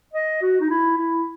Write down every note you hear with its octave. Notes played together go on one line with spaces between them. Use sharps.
D#5
F#4
D#4
E4
E4